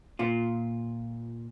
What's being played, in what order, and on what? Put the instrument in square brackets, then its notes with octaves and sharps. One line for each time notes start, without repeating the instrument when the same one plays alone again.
[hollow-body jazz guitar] A#2 F4